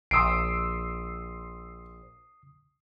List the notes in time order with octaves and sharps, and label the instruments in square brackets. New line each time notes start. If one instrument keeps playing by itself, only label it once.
[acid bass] A#1 [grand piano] C6 E6 D7 [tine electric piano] D#6 C7